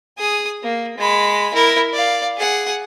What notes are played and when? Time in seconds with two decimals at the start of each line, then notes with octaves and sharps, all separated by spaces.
0.18 G#4 D#6
0.63 A#3
0.98 G#3 B5
1.54 E4 A#4
1.93 D5 F5
2.38 G#4 F#5